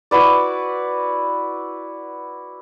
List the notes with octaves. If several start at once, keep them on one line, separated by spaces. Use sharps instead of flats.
E4 F#4 B4 D5